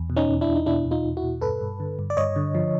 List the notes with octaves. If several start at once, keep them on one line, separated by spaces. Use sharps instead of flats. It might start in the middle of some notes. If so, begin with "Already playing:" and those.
Already playing: E2
B2
C#4 D#4
E2
D4 E4
E2
D#4
B2 D4 E4
E2
D#4 F4
E2
E4 F#4
B2
G2 A4 B4
G2
D3
G2
D5
G2 C#5 D#5
D3
F3